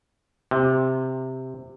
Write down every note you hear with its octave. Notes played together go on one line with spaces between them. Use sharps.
C3